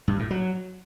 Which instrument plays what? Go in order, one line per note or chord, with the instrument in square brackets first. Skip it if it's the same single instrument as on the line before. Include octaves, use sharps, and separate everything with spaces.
[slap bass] G2
A2
F#3